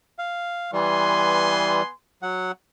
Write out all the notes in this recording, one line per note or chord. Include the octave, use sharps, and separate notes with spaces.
F5
E3 G3 B3 G#5 C6
F#3 F#5